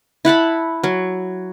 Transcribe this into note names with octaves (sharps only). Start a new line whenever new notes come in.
E4 F#5 A5 B5
F#3